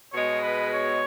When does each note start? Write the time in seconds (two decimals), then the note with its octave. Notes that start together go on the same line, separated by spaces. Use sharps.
0.13 B2 G#3 C#5
0.42 B4
0.72 C#5